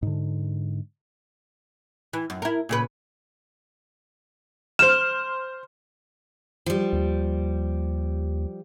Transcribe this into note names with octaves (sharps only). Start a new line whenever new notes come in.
G#2 D3
E3
F#2
E4 A#4
A#2 C#3 B4
C5 F6 E7
F3 G3
D#2